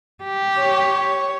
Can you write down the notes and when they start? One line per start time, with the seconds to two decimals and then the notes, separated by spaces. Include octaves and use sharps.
0.24 G4
0.59 C#5